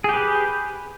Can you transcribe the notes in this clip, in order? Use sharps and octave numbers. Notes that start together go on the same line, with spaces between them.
G4 G#4 B4